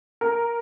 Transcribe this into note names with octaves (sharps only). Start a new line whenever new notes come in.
A#4